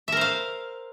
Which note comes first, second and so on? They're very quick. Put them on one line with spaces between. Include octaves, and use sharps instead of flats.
E5 A#4 C5 F5